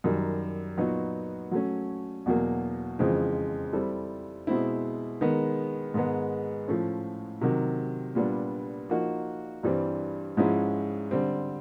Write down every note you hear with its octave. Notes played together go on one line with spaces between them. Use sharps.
F#2 D#3 G3
A#2 F#3 B3 D#4 F#4
F#3 A3 C#4
E2 B2 F#3 A#3
F2 C#3 E3 G#3 C4
G3 C4 E4 A4
B2 G#3 C4 E4
D#3 G#3 B3
G#2 D#3 G#3 B3
A2 F3 A3 C#4
C3 D#3 F#3
A#2 G3 B3 D4
F3 A#3 D#4 F#4
G2 E3 G3 C4
G#2 F3 G#3 C#4 E4
D3 G3 C4